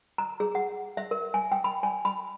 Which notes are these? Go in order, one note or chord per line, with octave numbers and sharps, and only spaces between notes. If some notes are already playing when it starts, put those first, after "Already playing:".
A#5
G#4
F#5
E5
A#4
G#5
G5
B5
G#5
B5